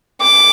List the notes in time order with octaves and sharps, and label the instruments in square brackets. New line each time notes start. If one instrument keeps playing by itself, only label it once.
[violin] D6